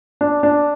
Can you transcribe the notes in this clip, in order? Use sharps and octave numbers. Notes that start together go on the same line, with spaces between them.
D4
D4